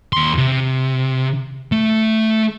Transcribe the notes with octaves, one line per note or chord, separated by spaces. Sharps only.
D#2 C6
C3
A3